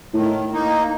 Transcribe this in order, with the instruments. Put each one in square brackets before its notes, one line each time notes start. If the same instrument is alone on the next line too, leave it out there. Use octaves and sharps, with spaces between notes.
[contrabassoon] A2 [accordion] D#3
[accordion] A#3 D#4